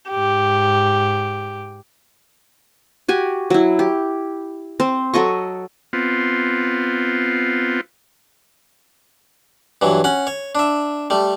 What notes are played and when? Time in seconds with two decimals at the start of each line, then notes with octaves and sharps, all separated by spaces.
0.11 G#2 G4
3.08 F#4 G4 G#5
3.50 F#3 E4
3.79 G4
4.80 C4 C5
5.14 F#3 A4 D#5 C#6
5.93 B3 C4 F4
9.81 G2 E3 F#3
10.04 C#4 F#5
10.27 C#5
10.55 D4 E5
11.10 G3 A3